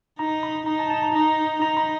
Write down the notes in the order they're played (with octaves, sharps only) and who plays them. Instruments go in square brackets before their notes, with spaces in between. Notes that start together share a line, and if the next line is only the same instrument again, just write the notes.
[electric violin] D#4 [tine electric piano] A#5
[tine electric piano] B5
[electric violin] D#4 [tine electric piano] A#5
[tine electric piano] A5
A5
A#5
[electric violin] D#4 [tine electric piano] A#5
[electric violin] D#4 [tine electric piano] A#5
[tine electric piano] B5